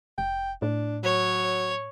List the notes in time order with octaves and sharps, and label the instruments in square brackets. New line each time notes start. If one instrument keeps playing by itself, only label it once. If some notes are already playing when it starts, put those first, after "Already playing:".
[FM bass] F1 [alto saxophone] G5
[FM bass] A2 [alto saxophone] D4
[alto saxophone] F#3 [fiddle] C#5